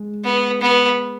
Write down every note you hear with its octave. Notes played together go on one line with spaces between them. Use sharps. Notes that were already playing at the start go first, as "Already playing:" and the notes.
Already playing: G#3
B3
B3